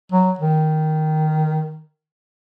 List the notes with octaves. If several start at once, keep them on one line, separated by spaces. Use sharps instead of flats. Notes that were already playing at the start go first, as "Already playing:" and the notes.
F#3
D#3